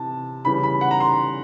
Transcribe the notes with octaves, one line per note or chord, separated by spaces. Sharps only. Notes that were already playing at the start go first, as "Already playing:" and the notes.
Already playing: C3 E3 A5
C#3 E3 G3 B5
B5
F#5
A#5
C6